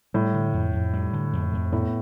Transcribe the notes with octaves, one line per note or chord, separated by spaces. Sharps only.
A2 G3
D3
F2
F2
G3
D3
F2
F2
A2 B3